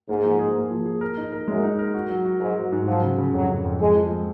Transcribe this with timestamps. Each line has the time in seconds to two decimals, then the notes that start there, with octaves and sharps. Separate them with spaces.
0.09 G#2 A#3
0.24 F3
0.39 G#4
0.55 A#3
0.71 F3
0.86 G#4
1.01 A#4
1.17 D#4
1.32 A#4
1.48 F#2 G#3
1.63 D#4
1.79 A#4
1.94 F#4
2.09 F#3
2.25 F#4
2.40 G#2 F#3
2.56 F#3
2.72 G#2
2.87 F3 F#3
3.03 C#3
3.18 C#3
3.33 F2 F#3
3.49 C#3
3.65 F2
3.80 F3 G#3
3.96 F3
4.11 G#3